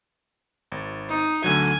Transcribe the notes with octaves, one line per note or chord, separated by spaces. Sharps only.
G#1
D#4
D2 D3 F#3 G#5